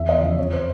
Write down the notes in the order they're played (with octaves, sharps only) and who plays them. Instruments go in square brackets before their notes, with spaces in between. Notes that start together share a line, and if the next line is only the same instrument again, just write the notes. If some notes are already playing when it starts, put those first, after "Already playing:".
Already playing: [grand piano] E2 E5
D#5
C#3 F3
F2 C#5
C5